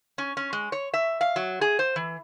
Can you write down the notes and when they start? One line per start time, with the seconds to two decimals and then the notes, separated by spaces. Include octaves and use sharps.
0.18 C#4
0.37 C#4
0.53 G#3
0.72 C#5
0.94 E5
1.21 F5
1.36 F#3
1.61 G#4
1.79 C5
1.96 E3